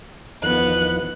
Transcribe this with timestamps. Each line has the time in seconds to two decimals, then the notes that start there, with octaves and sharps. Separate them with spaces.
0.43 E2 D#3 F3 B3 F#6